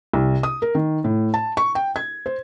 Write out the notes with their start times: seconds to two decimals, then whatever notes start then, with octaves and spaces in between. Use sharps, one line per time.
0.13 C2
0.43 D#6
0.62 A#4
0.75 D#3
1.04 A2
1.34 A5
1.57 C#6
1.75 G5
1.96 G#6
2.26 C5